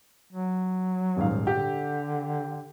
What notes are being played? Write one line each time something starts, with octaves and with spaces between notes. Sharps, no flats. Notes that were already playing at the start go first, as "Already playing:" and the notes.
F#3
D#1 G#2 F5
D3 G4